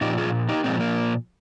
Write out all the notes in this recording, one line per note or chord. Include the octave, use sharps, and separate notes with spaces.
A#2 F3 D#4 G4
F4 G#4
D#4 G4
A#2 F3 G#3 C4
A#3